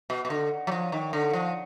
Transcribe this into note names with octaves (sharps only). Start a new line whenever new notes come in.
B2
B2
D3
F#3
F3
D#3
D3
F3